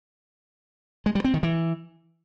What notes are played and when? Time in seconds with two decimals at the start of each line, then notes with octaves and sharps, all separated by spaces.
1.06 G#3
1.15 G3
1.24 C4
1.34 D#3
1.43 E3